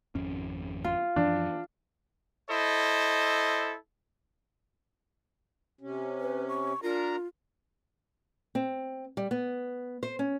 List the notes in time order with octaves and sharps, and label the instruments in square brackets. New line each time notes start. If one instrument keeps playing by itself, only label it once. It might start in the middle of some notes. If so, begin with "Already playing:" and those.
[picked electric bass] G#1 F2 C#4
[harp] F4
[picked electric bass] F#2 E3 F3 [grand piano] D4
[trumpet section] E4 A4 C5 D#5
[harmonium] C3 C#4
[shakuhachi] B4
C#6
[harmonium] D4 A#4 A#5 [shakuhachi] F4
[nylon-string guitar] C4
G3
B3
C5
C#4